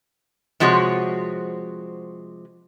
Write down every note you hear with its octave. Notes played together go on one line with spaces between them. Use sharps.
C3 F3 G#3 F#4 C#5